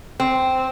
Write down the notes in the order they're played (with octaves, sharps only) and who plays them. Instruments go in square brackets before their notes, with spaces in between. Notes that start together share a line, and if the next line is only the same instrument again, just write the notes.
[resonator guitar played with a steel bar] C4